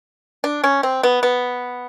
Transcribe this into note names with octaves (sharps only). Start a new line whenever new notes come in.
D4
C#4
C4
B3
B3